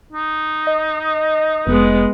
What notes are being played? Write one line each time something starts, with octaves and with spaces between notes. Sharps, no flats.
D#4
D#5
F1 G#3 B3